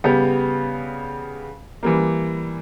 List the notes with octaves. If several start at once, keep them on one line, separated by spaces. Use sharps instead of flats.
C#3 G3 B3 G4
E3 G3 A#3